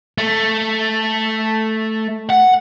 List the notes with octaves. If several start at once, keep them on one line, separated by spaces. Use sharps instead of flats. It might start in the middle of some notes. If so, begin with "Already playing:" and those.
A3
F#5